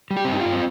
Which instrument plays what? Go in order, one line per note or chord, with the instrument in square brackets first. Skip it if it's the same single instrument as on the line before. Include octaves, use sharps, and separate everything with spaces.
[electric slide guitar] G3
G4
C4
G2
D#4
F4
G2
C4